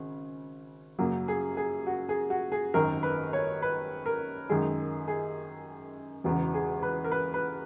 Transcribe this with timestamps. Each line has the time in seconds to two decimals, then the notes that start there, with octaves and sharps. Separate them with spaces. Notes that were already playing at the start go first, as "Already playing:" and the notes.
Already playing: G#1 C#3
0.99 F#2 C#3 F#3 A#3
1.28 G#4
1.57 G#4
1.87 F#4
2.09 G#4
2.30 F#4
2.52 G#4
2.74 G#1 F#2 D#3 A#4
3.03 B4
3.33 C#5
3.62 B4
4.06 A#4
4.49 F#2 D#3 G#3 G#4
5.08 G#4
6.24 E1 E2 C#3 F#4
6.54 G#4
6.83 B4
7.04 A#4
7.11 B4
7.34 B4